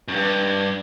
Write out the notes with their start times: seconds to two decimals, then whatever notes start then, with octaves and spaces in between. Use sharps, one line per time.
0.08 F#2
0.16 G2